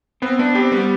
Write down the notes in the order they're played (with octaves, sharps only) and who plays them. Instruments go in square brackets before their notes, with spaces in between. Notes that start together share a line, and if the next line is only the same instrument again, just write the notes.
[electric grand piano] B3 [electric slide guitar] C4
[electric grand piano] B3 [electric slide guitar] D4
[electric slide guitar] C4 [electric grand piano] G4
[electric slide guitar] G3 [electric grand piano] B3